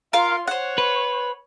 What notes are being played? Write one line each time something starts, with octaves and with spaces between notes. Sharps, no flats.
F4 A#4 F5 C6
C5 C#5 F#5
B4